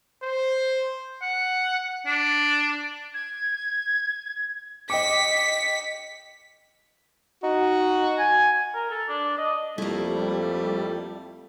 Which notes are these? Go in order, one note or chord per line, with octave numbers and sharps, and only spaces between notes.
C5
F#5
D4
G#6
D#5 G5 D6 B6 C#7
D#4 F#4
G#5
A#4
A4
D4
D#5
F2 G3 A3 A#3 E4